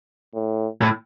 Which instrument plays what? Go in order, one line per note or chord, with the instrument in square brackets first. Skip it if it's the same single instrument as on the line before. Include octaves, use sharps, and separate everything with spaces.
[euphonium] A2
[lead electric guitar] A2